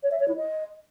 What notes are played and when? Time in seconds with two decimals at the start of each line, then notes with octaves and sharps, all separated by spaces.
0.03 C#5
0.11 E5
0.19 C#5
0.28 E4
0.36 D#5